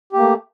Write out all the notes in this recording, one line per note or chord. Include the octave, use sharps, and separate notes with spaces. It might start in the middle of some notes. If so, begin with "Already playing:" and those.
A3 A#3 G4